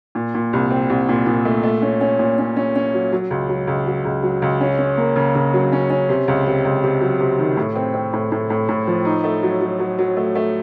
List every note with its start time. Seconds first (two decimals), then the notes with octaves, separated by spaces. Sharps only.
0.15 A#2
0.34 A#2
0.53 C2
0.71 C4
0.90 C2
1.09 A#2
1.27 A#2
1.45 A3
1.63 A3
1.82 C#4
2.01 C#4
2.19 A#2
2.38 C#4
2.56 C#4
2.76 C#4
2.94 F#3
3.12 F#3
3.31 C#2
3.49 F#3
3.67 C#2
3.87 F#3
4.05 C#2
4.23 F#3
4.42 C#2
4.61 C#4
4.79 C#4
4.98 A#3
5.16 C#3
5.35 C#3
5.54 F#3
5.72 C#4
5.90 C#4
6.09 C3
6.28 C#2
6.46 C3
6.65 C#2
6.84 C3
7.01 F#3
7.20 C3
7.38 D#3
7.57 A2
7.76 C4
7.94 C4
8.13 A2
8.32 A2
8.50 A2
8.68 A2
8.87 F3
9.05 D#4
9.24 A3
9.43 F#3
9.61 F#3
9.79 F#3
9.99 F#3
10.17 A3
10.35 A3